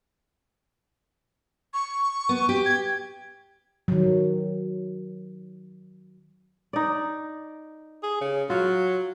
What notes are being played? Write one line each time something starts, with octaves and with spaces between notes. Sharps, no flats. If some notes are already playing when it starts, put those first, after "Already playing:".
C#6
B3
G4
G#6
D#3 F#3
D#4 D5
G#4
C#3
F#3 F4 F5